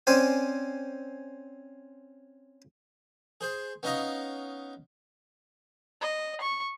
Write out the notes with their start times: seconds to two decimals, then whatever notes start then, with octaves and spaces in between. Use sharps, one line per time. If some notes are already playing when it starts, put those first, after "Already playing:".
0.07 C4 C#4 C5 D5 G#5
3.41 G#4 C5
3.83 B3 C#4 D#4 D#5 F5
6.02 D#5
6.41 C#6